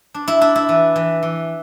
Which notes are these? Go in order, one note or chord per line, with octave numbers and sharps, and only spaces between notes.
D4
E4
D4 E4
E4
E3
E3
E3